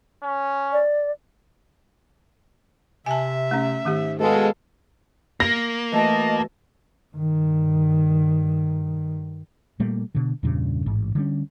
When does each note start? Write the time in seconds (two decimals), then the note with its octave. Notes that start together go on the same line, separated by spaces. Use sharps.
0.23 C#4
0.72 D5
3.06 C3 E5 G#5 A5
3.51 A3 C#4
3.85 G#2 D#3 A3 G4
4.20 B2 G#3 A4 F5
5.40 A#3 A#6
5.92 E3 A3 F#4 D#5 A5
7.14 G2 D#3
9.80 A#2 G3 A3 A#3
10.15 B2 D3
10.43 E2 G2 A#2 C#3
10.86 A1 G#2
11.15 D3 G3 C#4